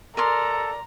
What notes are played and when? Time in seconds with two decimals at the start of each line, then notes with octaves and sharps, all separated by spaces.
0.17 A4 A#4 D5 A#5 C6